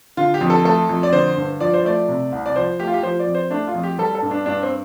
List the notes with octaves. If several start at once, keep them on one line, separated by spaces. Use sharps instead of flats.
D3 F4
G4
F2
A4
A3 A4
F2
D5
D3 C5
G2
F3 D5
C5
A3 D5
C3
C2
D5
F3 C5
A3 G4
F4
G4
F3 C5
D5
F2
C5
A3 D4
F4
F2
G4
G3 A4
A4
G2
D4
G2 D4
C4